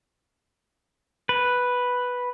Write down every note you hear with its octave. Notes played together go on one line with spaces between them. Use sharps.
B4